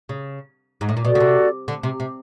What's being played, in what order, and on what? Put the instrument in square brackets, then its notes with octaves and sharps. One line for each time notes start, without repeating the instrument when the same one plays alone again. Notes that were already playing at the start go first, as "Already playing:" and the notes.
[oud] C#3
G#2
A2
A#2
[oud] B2 [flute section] F#4 A4 D5
[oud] C#3
C3
D3
C3
C3